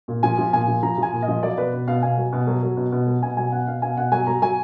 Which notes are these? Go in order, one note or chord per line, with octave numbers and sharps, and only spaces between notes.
A#2
F3 G#5
F3
A#2 G#5
F3
F3 A#5
F3 G#5
A#2
D#5
F3
F#3 D5
B2 B4
B2
B2 F5
B2 G#5
F#3
B2
F#3
F#3
B2
B2
F#3
B2 G#5
F#3 G#5
B2 F#5
B2 F5
B2 G#5
B2 F#5
F#3 G#5
F#3 A#5
F#3 G#5